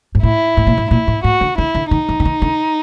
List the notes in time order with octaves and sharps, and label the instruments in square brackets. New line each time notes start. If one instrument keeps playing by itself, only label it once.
[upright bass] G#2
[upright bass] A2 [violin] E4
[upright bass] A2
A#2
A2
[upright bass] A#2 [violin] E4
[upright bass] A2
[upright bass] A2 [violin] F#4
[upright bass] D3
[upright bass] D3 [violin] E4
[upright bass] D3
[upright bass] D#3 [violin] D#4
[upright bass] E3
D3
D#3
D3